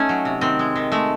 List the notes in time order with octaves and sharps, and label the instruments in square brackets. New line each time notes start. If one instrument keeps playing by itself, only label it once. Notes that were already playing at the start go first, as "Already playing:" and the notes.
Already playing: [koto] A3 C#4 D#4
F#3
C3
D#3 C4
G#3
D#3
G#3 A3